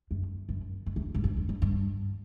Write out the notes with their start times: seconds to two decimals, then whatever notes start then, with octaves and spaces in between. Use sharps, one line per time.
0.11 F#2
0.49 F#2
0.86 F2
0.96 E2
1.14 G2
1.24 F#2
1.37 F2
1.49 F2
1.62 G2